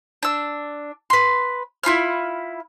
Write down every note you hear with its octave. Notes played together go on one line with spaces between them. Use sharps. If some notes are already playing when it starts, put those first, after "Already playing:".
D4 E6
B4 C6
E4 F4 B5 F6